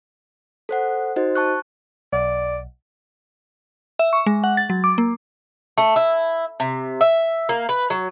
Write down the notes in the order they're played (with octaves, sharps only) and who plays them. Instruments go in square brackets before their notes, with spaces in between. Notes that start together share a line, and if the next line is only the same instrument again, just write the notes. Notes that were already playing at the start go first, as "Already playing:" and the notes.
[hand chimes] A4 C5 F#5
D#4 F#4 C5 D#5
A5 C#6 F#6
[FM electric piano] B1 [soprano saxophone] D5
[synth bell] E5
C#6
G#3
F#5
A6
F#3
D6
A#3
[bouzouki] A3
E4
C3
E5
A#3
B4
F#3